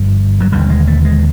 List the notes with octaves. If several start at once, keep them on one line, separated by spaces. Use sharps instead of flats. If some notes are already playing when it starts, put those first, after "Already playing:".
Already playing: G1 G2 D3 F3
F#3
E1 D#2 D3 G3
G#3
A3
G#3